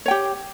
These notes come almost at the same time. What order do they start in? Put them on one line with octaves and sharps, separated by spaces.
C#5 G5 G4